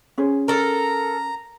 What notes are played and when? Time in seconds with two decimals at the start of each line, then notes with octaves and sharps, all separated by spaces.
0.18 C#4 G#4 C5
0.48 A4 A#4 A#5